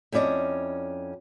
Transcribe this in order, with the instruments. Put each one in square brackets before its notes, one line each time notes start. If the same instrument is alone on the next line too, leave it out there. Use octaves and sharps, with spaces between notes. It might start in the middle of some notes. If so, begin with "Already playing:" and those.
[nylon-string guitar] F2 C#4 E4 D5 D#5